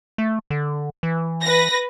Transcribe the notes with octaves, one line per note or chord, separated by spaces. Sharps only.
A3
D3
E3
B4 A#6